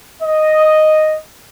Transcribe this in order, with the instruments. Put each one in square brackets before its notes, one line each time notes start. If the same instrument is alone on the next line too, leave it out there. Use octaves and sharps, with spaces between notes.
[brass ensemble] D#5